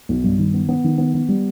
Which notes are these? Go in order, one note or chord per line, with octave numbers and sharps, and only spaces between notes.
B1
G2
D#3
B3
B3
D#3
B3
B3
G3